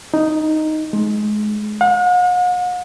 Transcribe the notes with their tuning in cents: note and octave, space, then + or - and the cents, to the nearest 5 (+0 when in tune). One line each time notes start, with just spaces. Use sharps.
D#4 +0
G#3 +30
F#5 -45